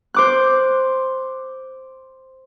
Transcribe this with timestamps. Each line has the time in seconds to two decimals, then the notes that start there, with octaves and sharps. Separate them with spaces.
0.14 C5 D6 F#6